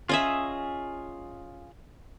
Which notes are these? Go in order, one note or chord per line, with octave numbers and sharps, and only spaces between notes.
C#4 F4 G#4 D#5 E5